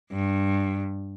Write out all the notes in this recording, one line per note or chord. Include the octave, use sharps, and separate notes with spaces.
G2